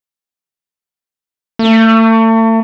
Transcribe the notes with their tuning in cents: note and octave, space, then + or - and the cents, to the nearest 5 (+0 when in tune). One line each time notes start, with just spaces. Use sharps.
A3 +35